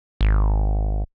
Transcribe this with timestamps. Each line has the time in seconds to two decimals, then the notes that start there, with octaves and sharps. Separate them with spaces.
0.21 G#1